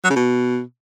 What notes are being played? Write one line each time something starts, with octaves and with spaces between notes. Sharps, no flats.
F#3
C#3
B2